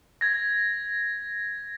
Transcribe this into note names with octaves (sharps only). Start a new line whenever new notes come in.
G#6 A#6